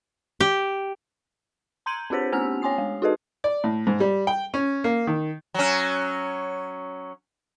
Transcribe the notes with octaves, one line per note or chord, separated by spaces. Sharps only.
G4
A#5 C6 G6 G#6 D#7 F#7
C4 D4 F4 G4 C5 B6
A3 B3 C#4 E6 F6 F7
C#5 G#5 C6 D#6 C7
G#3
D#4 F#4 G#4 A4 B4 D#5
D5
A2
G#2
G3
G5
C#4
A#3
D#3
F#3 C#4